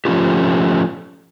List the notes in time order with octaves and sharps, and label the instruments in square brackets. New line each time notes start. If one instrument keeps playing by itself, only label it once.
[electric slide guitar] F3 A3 C#4 F4 G4